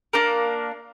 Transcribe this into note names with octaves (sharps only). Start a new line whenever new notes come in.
A#3 D4 A#4